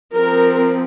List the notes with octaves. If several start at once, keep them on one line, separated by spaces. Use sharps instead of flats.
F3 C4 A#4